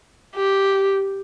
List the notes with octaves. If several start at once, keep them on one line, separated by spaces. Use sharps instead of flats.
G4